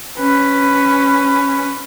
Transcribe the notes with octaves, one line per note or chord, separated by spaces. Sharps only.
C#4 B4